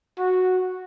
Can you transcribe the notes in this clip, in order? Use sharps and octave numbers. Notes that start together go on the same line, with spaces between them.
F#4